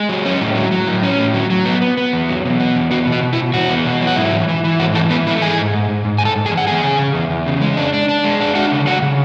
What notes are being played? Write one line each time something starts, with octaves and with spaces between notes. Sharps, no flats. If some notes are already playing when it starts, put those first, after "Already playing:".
Already playing: G#3 G#4
F#3
C#4
A2
F#3
F#3
A2
C#4
A2
F#3
F#3
B3
B3
B3
E2
F#3
B2
B3
E2
B3 F#4
B2
F#4
B2
E4
B2
E2 F#4
B3
B2
F#3
F#4
G#2 E4
E3
E3
E3
G#2 F#4
E3 A3 A4
E3 B3 B4
A3 E4 E5
G#2 G#4 G#5
G#2
G#2
G#2
G#2
G#2 G#5
A4 A5
G#2
G#4 G#5
E3
F#5
E2 G#4 G#5
C#3
C#3
E2
E2
C#3
G#3
D4
D4
D4
G#3
D4
D4 F#4 F#5
C#3
G#3 F#4 F#5
C#3